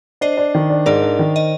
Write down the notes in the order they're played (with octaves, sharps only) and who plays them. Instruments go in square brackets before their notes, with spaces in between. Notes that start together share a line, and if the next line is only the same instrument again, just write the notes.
[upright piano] D4 [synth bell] C5 D#5
[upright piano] D4
D#3
D4
[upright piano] G#2 [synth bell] A#4 D5
[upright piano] D4
D#3
[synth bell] D#5